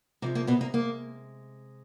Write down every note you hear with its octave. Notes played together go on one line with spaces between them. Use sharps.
C3 F3 G#3 A#3
A#3
B2 B3
A#3
A#3